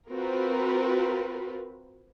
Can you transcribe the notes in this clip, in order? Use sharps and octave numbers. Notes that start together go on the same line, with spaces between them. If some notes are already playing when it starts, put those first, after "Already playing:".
C4 F4 F#4 A#4 B4